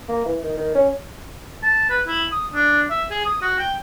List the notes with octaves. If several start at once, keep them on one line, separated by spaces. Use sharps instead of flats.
A#3
E3
D#3
D#3
C#4
A5
B4
E4
D#6
D4
E5
G#4
D#6
F#4
G5